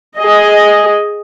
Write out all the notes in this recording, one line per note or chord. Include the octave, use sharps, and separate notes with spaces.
G#4 D#5